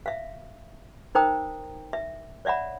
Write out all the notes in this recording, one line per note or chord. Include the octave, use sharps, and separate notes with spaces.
E5 F5
D#4 A#4 C5 G5 A#5 D#6
E5
C#5 D5 E5 F#5 B5